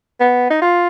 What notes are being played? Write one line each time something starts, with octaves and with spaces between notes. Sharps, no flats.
B3
D#4
F4